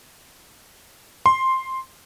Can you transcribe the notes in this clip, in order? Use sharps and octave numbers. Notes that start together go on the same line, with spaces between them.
C6